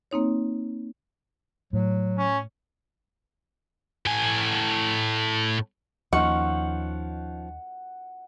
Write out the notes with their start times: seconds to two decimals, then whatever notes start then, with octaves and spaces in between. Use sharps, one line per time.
0.11 A#3 C4 D#4 C#5
1.73 A2 F#3
2.18 C#4
4.06 A2 G#5
6.13 D#2 F3 A#3 C#4 D#4 F#5 C#6